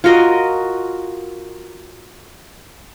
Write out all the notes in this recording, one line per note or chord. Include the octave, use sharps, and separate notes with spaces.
F4 F#4 A#4 D#5